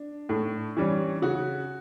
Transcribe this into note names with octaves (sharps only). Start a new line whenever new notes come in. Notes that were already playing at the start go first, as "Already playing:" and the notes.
Already playing: D4
A2
E3 G3 C#4
C#3 F#4